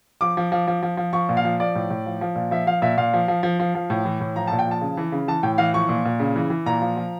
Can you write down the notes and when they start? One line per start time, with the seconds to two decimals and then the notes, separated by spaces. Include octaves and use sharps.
0.21 F3 D6
0.37 F3
0.52 F3
0.67 F3
0.83 F3
0.97 F3
1.13 F3 C#6
1.29 A#2
1.37 F5
1.45 F3
1.60 F3 D5
1.75 A2
1.90 A2
2.06 F3
2.21 F3
2.36 A#2
2.51 F3 E5
2.67 F3 F5
2.82 A#2 E5
2.97 A#2 F5
3.13 F3
3.28 F3
3.43 F3
3.60 F3
3.75 F3
3.90 A2
4.05 E3
4.21 A2
4.36 F3 A#5
4.47 A#2 A5
4.59 G5
4.66 F3 A5
4.81 C#3
4.97 E3
5.12 C#3
5.28 E3 A5
5.43 A2 G5
5.58 E3 F5
5.74 F3 C#6
5.89 A#2
6.05 A#2
6.20 C#3
6.36 E3
6.50 E3
6.66 A#2 A#5
6.82 F3
6.97 F3